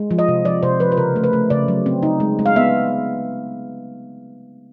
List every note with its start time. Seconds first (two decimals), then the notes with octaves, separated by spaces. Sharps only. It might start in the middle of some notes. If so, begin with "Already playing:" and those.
Already playing: G#3
0.11 F3
0.18 D#5
0.28 C3
0.45 F3 D5
0.63 C3 C5
0.80 F3 B4
0.92 B4
0.97 C#3 A#4
1.16 A3
1.24 B4
1.33 A3
1.50 C#3 D5
1.68 F#3
1.86 C4
2.03 D#4
2.20 G#3
2.39 G#3
2.46 F5
2.56 B3 E5